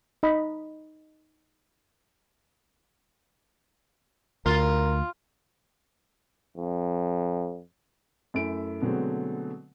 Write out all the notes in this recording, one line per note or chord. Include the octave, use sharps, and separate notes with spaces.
D#4 D#5 B5
D2 F4 A#4
F2
F#2 A3 E4 D7
B2 D3 F#3 G#3 A3 C4